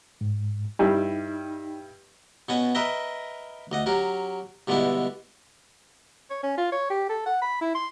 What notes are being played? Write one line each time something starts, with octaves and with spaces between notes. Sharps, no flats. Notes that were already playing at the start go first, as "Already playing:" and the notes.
G#2
G2 G3 D#4 E4
B2 B3 C#4 F#4 C#5 G#5
A#4 B4 D#5 E5 G5 A#5
D2 D#5 F#5
F#3 C#4 G4 A#4
G2 B2 D3 G#3 D4 E4
C#5
C#4
F4
C#5
G4
A4
F#5
B5
E4
C6